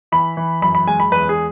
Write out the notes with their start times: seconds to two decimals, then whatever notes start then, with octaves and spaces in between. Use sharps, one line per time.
0.12 E3 B5
0.37 E3
0.62 F#2 B5
0.75 B5
0.87 G#3 G#5
1.00 B5
1.12 E2 B4
1.29 G#4